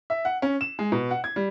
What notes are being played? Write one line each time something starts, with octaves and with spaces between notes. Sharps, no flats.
E5
F#5
C#4
E7
G#3
B2
F#5
G#6
G3